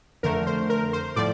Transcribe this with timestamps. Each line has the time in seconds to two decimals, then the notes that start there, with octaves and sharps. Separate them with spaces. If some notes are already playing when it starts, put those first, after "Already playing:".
0.23 F2 D3 A3 A#4
0.46 C5
0.70 A#4
0.93 C5
1.16 A2 F3 D5